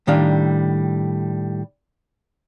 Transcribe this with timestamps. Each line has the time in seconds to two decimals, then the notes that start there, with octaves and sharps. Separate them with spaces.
0.07 A2 D#3 G3 D4 F5